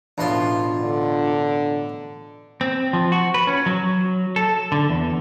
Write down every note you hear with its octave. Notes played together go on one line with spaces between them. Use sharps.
A1 B2 D4 F4 C6
D3
C4
F3
F#4
B4
C#4
F#3
A4
D3
E2